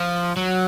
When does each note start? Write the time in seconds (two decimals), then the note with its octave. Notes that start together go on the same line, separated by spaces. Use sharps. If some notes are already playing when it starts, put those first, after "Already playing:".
Already playing: F3
0.36 F#3